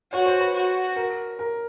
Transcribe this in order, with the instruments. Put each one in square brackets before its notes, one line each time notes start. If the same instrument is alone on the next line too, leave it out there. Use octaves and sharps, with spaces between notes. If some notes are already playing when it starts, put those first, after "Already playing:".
[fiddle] F#4 [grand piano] C#5
[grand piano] C5
B4
[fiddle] F#4
[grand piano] A#4
A#4